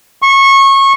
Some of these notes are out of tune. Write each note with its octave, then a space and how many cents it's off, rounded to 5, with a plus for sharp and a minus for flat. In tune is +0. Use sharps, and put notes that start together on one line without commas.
C#6 -25